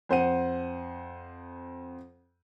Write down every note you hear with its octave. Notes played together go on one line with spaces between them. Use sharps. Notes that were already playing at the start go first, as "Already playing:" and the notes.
F2 C5 F#5 D#7